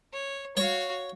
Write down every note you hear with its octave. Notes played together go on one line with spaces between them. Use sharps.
C#5
F#4 C#5 F5 C#6